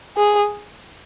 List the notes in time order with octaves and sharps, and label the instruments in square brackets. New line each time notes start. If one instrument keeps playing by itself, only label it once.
[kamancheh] G#4